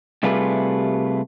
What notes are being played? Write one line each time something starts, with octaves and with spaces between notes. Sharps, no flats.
C3 G3 A3 F4 G#4 B4